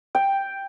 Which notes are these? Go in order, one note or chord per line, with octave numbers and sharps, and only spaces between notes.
G5